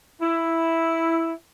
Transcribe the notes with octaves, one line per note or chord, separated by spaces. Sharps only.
E4